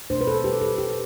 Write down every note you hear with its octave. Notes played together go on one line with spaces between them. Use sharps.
B2 A3 D4 C5
B4
A4
G4
A4
G4